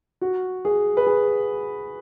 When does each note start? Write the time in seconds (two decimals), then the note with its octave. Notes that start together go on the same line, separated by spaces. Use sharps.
0.21 F#4
0.65 G#4
0.97 B4
1.06 G#4